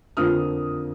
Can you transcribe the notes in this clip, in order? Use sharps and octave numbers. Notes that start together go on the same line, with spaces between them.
F2 D3 F3 A#3 D#6 F6